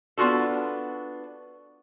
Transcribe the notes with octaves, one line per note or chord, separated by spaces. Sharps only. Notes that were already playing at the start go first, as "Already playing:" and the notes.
B3 D4 F4 F#4 A4